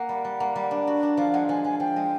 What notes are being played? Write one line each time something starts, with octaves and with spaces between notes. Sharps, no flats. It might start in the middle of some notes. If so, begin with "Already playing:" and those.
Already playing: A#3 F#5
G3
G3
A#3
G3
D4
F#4
D4
F3 F5
G#3 F#5
F3 G#5
F3 G#5
F3 G5
G#3